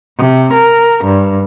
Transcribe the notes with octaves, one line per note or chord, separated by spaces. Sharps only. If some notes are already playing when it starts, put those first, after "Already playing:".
C3
A#4
G2